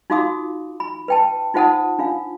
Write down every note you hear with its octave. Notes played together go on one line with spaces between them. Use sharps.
D#4 F4 F#4 F5 D6 D#6
B5
B4 G5 A5
D#4 F4 C5 F#5 A5 D#6
D4 F4 F5